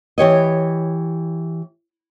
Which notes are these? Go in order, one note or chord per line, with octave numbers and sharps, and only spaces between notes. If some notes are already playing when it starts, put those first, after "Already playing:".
E3 G4 C#5 D#5